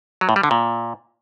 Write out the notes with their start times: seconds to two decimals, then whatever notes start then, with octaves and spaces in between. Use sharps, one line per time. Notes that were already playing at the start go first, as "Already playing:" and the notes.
0.21 F#3
0.29 A2
0.36 G3
0.43 D3
0.51 A#2